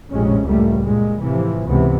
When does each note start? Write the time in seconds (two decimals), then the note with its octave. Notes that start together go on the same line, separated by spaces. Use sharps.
0.11 A#1 F2 A2 C3 G#3 C#4
0.45 C#2 A2 G3 A3 A#3
0.82 G2 A#2 G#3
1.19 A2 C3 E3 F3
1.67 C#2 G#2 C3 E3 B3